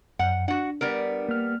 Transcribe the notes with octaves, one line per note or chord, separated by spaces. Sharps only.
F#2 F#5
D4 F#4 F#5
G3 B3 A#4
A#3 F6